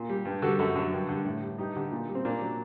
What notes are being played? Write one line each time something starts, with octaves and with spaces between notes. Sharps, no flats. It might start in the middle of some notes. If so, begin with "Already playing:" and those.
Already playing: A#2
G3
G2
D3 G3 F#4 A4
F#2 F#4 A4
D3 F#3
G2
D3 G3
A2
G3
G2 D#4 G4
D3 G3
A#2
G3
C4
A#2 A#3 D4
F#3